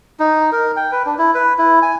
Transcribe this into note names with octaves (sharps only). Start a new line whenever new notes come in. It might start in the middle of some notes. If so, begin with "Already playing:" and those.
D#4
A#4
G5
B4
D4
E4
B4
E4
G#5